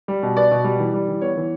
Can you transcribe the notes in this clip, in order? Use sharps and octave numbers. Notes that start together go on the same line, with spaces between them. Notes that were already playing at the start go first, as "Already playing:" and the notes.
G3
B2
B3 D5
B2
G3
E3
G3
E3
B3 C#5
E3